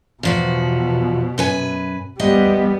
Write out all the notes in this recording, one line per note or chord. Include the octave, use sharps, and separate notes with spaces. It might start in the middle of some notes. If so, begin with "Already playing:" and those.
E2 B2 F3 F#4
F#2 B4 G#5
D2 G3 B3 D#5